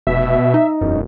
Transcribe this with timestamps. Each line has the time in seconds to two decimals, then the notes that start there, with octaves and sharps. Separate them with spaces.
0.07 F1 B2 E5
0.54 D#4
0.81 E1 F#2